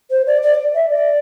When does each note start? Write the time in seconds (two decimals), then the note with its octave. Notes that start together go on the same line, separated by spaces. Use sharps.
0.11 C5
0.27 D5
0.43 D5
0.75 E5
0.90 D5